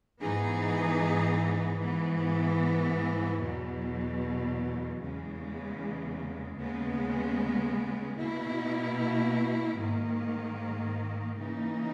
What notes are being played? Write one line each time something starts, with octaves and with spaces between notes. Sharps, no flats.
G#2 E3 B3 D#4 G#4
G#2 E3 B3
E2 B2 F#3
E2 C#3 G#3
D#2 C#3 G#3 B3
B2 A#3 E4
G#2 D#3 A#3
C#3 E3 A#3 D#4